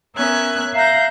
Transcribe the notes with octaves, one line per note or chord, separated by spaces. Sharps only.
B3 C#4 A#4 E5 F#6 G#6
E5 F5 A#5 F#6 G6 A#6